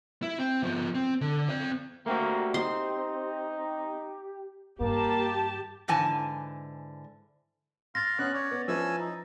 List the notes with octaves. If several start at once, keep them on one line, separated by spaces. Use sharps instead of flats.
E4
C4
F3 B3
C4
D3
C4 F5
A3 A#3 C4 F#4 G4
C4 D#4 C6
G2 D#3 A#3 G4 A5
G#2 D3 E3 G#5 A5
F5 C6 A6 A#6
B3 C#4 F#6
C#5 D5
B3
F3 C#4 E4 B4 G#5 E6
D#4